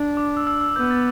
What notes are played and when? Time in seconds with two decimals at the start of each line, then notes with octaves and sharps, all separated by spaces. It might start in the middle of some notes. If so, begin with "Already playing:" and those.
Already playing: D4
0.17 D6
0.37 E6
0.47 E6
0.61 E6
0.76 B3 G6
0.91 A6